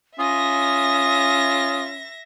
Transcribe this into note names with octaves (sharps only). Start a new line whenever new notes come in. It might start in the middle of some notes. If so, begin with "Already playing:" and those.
C#4 F4 E5 D#6 A#6